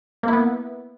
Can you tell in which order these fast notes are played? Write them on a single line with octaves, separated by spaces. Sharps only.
A#3 E4 B3